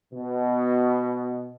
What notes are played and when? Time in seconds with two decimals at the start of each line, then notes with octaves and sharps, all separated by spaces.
0.13 B2